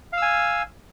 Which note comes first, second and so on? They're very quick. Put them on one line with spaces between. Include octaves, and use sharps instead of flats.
F5 E6 G#5